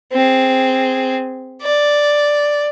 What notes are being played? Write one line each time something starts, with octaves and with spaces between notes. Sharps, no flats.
C4 G#4
D5